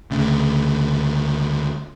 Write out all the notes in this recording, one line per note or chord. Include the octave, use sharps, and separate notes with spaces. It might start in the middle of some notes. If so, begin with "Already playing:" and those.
D2 C#3